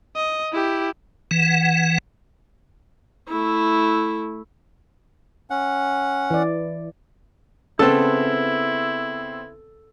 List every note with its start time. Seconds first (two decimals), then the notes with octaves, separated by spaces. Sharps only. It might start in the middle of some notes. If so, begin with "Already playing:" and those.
0.16 D#5
0.53 E4 G4
1.31 E3 F#5
3.28 A3 E4
5.50 C#4 F#5
6.31 E3 D5
7.79 C#3 B3 C4 E4 A4